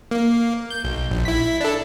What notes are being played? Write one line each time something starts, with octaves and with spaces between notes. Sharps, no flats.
A#3
G6
B1
A#1
E4 B6
D4 A4